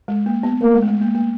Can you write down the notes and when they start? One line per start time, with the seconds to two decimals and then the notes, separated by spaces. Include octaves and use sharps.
0.08 G#3
0.26 A#3
0.43 B3
0.62 A3 A#3
0.74 G#3
0.82 A3
0.88 G#3
1.01 A#3
1.15 A#3